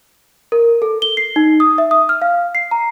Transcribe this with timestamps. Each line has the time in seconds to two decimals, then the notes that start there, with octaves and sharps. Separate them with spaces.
0.52 A#4
0.82 A4
1.02 G7
1.17 C7
1.36 D#4
1.60 D#6
1.78 E5
1.91 D#6
2.09 F6
2.22 F5
2.55 C7
2.71 A#5